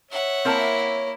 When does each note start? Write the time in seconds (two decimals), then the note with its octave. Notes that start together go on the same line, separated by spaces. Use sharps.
0.11 C#5 E5 F#5
0.45 A#3 C4 E4 A#4 A5